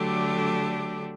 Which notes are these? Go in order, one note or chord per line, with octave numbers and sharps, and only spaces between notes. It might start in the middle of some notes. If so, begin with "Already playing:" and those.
Already playing: D3 F#3 A3 D4 G4